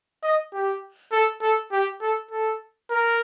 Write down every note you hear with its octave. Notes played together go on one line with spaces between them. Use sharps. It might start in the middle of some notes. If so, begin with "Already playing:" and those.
D#5
G4
A4
A4
G4
A4
A4
A#4